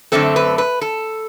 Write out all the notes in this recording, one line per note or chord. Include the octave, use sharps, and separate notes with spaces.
F#2 D3 A3 C4 A4
B4
B4
A4